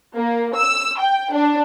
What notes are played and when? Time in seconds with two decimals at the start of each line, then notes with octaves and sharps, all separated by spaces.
0.15 A#3
0.56 E6
0.99 G5
1.33 D4